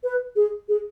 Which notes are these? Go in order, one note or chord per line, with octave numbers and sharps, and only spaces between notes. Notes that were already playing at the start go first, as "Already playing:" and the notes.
B4
G#4
G#4